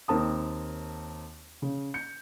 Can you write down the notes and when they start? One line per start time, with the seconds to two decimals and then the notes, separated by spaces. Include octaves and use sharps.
0.08 D#2 C4 A#4 A5 D#6
1.62 C#3
1.94 G6 C#7